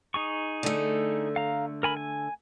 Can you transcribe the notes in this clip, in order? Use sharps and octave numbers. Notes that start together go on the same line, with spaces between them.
D#4 G#4 C#6
D3 A3
F5 A#5
A#4 G#5 B5
G#5